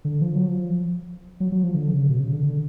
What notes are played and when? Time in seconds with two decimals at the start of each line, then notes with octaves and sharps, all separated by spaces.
0.05 D3
0.21 F3
0.35 F#3
0.48 F3
1.40 F#3
1.52 F#3
1.63 F3
1.74 D3
1.91 C#3
2.09 B2
2.20 C#3
2.32 D3
2.43 D3